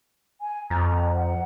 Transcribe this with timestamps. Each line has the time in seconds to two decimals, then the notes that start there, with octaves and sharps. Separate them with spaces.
0.41 G#5
0.70 F2 A#5
1.15 F#5